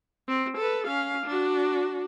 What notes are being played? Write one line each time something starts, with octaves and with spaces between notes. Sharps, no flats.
C4
A4 B4
C#4 F5
D4 F#4